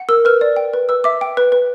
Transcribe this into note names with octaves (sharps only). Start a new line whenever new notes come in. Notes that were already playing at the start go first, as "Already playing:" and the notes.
Already playing: F#5
A#4 E6
B4 F6
D5
G5
B4
B4 E6
E5 D6
G5
B4
B4